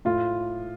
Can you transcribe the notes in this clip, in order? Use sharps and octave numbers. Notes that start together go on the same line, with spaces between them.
A2 F4